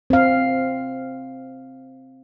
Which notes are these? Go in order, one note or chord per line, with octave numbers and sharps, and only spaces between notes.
C4 F5